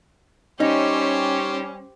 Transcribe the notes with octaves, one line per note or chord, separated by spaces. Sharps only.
G3 C#4 D#4 G4 C5